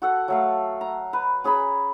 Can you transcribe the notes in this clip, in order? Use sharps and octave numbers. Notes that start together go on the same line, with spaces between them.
F#4 A4 F#5
F#3 A3 F5
A#5
B4
C#4 G#4 A#5 B5